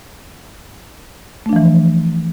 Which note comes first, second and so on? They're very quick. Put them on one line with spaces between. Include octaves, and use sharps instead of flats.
A3 D4 F3 E3